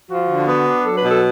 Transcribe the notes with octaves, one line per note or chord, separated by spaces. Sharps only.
F3 F#4
D3
B3
D4
F#3 A4
B4
B2
A4